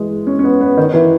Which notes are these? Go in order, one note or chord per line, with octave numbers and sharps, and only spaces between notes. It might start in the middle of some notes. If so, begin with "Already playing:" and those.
Already playing: E3 G#3
C#4
C#4
B3
B3
D#3
E3